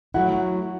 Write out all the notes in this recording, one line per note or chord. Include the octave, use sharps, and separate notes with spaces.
F#3 A3 E4 F#5